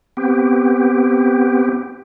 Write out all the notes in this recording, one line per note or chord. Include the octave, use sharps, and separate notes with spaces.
B3 C4 G4